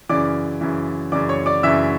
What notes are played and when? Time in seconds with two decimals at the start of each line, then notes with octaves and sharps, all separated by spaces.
0.09 F#2 C#3 E3 D5 D6
0.61 F#2 C#3 E3
1.12 F#2 C#3 E3 D5 D6
1.29 C#5 C#6
1.46 D5 D6
1.63 F#2 C#3 E3 E5 E6